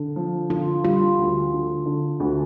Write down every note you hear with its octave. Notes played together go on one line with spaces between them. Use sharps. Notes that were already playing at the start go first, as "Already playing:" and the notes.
Already playing: D3
F3
D3 F4
G3 F4
D2
D3
D3
D2